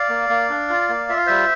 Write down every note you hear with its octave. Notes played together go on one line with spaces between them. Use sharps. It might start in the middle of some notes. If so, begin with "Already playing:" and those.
Already playing: D5 F5
A#3
A#3
D4
F4
A#3
F4 E5
F5
G3 C5 E5